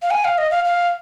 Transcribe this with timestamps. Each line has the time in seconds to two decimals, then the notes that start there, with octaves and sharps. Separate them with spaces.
0.02 F5
0.11 G#5
0.24 F5
0.38 D#5
0.51 F5
0.64 F5